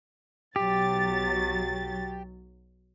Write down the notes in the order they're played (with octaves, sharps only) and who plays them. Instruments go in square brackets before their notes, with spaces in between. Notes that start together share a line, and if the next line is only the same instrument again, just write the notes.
[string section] B1 F#3 A6 [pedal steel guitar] G4